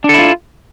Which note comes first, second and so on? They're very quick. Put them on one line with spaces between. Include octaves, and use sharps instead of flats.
D4 A4 E4 F4